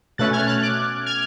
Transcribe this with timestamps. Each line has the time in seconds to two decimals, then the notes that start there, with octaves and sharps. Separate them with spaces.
0.18 B2 A3 C#4 F#6 A6
0.33 F6 G#6
0.47 F#6 A6
0.63 D6 F#6
1.06 F6 G#6